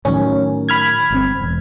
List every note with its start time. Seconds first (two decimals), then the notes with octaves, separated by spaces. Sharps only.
0.05 A2 D#3 F#3 C#4
0.69 B5 F6 G#6
1.11 G1 A#2 C4
1.41 E1